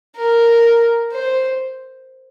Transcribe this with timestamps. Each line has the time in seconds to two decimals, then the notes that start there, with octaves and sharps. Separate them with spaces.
0.17 A#4
1.12 C5